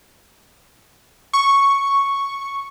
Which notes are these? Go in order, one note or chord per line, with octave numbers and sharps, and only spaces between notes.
C#6